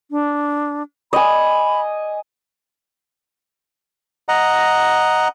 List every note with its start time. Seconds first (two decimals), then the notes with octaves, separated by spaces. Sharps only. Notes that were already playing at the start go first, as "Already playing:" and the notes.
0.11 D4
1.13 D#5 G#5 B5
4.29 D#5 F#5 A#5